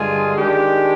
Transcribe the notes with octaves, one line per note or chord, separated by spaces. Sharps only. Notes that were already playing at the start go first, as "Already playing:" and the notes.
Already playing: G2 D3 G#3 F4 G#4
D#3 G#3 D4 G4